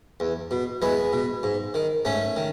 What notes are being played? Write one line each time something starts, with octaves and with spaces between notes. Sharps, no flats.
E2
B2
E2 G#3 B3
B2
G#2
D#3
G#2 A3 C#4
D#3